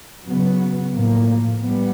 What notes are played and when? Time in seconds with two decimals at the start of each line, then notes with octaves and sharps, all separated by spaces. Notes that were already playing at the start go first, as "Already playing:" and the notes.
0.25 C#3 F#3 B3
0.93 A2 F3 A#3
1.60 G3 B3